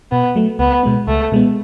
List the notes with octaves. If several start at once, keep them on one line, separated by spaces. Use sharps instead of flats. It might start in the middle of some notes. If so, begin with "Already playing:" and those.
B2 B3
F#3 A3
C#2 B3
B2 G#3 B3
C#2 A3
B2 G#3 B3